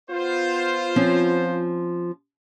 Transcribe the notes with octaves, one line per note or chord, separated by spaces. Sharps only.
B3 F4 C5
F3 C4 C#4